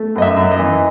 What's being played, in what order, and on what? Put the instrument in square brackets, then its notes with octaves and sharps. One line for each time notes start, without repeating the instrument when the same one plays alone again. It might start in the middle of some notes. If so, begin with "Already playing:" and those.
Already playing: [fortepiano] A3
F#2 D#5
E5
F#2
D#5
E3